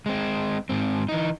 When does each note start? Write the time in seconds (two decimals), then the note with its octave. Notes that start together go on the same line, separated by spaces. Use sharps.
0.06 G#3 C4
0.69 G#2 C4
1.09 E3 D#4